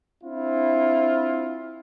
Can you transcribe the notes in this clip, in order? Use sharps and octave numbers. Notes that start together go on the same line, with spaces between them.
C4 D4 E4 F4